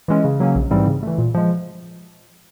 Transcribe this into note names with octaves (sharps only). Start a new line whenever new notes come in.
E3 G#3 C#4
C#3
F#3 A#3 C#4
A#1
G#2 E3 G3 C4
C#3
E3 A3
A#2
F3 G#3